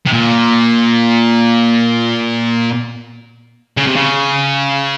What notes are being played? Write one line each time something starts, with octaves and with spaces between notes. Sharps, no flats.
C3
A#2
C#3
C3
C#3